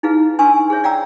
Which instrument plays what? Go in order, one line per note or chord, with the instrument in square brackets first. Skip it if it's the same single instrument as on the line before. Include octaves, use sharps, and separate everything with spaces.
[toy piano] D#4 E4 G#4 B4 F5
D4 B4 G#5 C6 C#6 E6
G#4 C5 C#5 E5
D5 F5 G5 A#5 E6